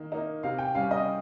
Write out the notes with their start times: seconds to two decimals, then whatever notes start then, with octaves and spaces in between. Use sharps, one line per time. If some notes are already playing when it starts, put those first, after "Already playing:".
Already playing: D#3 A#3
0.12 A#3 D#4
0.43 C3 F5
0.58 G5
0.75 G3 C#4 F5
0.91 D#5